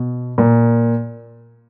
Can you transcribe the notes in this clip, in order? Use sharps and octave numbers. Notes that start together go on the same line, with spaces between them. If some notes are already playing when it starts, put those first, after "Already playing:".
Already playing: B2
A#2